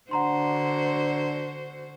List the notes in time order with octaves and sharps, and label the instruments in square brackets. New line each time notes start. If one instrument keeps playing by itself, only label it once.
[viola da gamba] D3 F#4 C5 [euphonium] D4 [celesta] F#5 A#5 C6